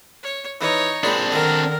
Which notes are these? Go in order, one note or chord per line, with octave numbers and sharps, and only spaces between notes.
C#5
E3 D#4 C#5
A#2 G#3 C4 D4 B5
D3 D#3 A#4